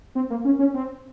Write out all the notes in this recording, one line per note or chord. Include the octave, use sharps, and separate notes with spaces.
C4
A#3
C#4
C#4
C4